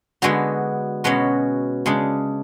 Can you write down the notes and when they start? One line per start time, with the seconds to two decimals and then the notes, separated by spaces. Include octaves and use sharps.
0.22 D3 G#3 B3 F#4
1.04 B2 G#3 C#4 F#4
1.86 C#3 G#3 D4